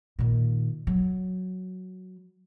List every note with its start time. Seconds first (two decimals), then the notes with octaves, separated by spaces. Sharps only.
0.19 A#2 D#3
0.87 F#3